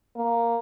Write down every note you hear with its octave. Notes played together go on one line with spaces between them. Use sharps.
A#3